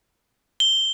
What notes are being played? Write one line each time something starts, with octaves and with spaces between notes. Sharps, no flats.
G7